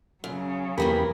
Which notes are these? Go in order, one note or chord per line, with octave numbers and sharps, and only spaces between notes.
F#2 C#3 F#3
E2 E3 A#3 G4 A#4 B5